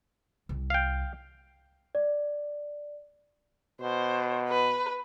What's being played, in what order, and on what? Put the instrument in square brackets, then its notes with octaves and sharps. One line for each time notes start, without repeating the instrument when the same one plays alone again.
[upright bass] C2
[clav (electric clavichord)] F5 G5
[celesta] D5
[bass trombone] B2 [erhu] C5
[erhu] B4